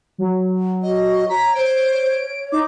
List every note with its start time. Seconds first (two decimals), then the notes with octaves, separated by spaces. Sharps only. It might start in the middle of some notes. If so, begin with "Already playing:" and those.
0.18 F#3
0.83 F#4 D#5
1.29 C#5 A#5 B6
1.55 C5 D7
2.52 D#4 D6